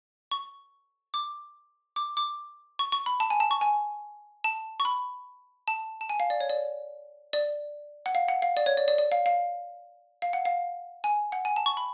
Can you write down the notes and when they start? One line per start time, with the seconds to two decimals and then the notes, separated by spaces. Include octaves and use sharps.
0.31 C#6
1.14 D6
1.96 D6
2.17 D6
2.79 C#6
2.92 C#6
3.06 B5
3.20 A5
3.30 G#5
3.40 A5
3.51 C#6
3.61 G#5
4.44 A5
4.80 C#6
4.85 B5
5.68 A5
6.01 A5
6.10 G#5
6.20 F5
6.30 D5
6.40 C#5
6.50 D5
7.33 D5
8.06 F#5
8.15 F5
8.29 F#5
8.42 F5
8.57 D5
8.66 C#5
8.77 D5
8.88 D5
8.98 D5
9.12 F5
9.26 F5
10.22 F5
10.33 F#5
10.45 F5
11.04 G#5
11.32 F#5
11.45 G#5
11.56 A5
11.66 C#6
11.77 B5